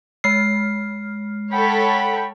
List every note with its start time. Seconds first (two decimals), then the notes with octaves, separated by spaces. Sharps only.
0.24 G#3 F6 C7
1.52 A4 C#5 F#5 G5 B5